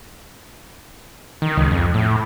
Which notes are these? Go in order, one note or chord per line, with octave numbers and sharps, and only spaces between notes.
D#3
C#2
F2
A2